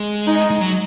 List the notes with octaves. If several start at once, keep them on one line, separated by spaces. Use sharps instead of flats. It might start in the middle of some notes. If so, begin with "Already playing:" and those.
Already playing: G#3
D#4
G#3
F#3